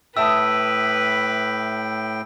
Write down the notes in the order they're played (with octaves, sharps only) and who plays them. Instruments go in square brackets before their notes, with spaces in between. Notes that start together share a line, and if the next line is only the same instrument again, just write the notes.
[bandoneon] A2 G5 [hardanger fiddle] B4 [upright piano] E5 A5 D#6 [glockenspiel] E6